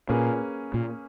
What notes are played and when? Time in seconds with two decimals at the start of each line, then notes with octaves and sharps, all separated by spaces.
0.09 A#2 A#3 C#4 G#4 B4
0.74 A#2